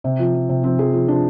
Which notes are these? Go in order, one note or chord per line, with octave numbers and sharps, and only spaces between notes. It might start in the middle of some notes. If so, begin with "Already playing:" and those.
C3
F3
F3
C3
F3 C4
F3 G#4
F3
F3 D4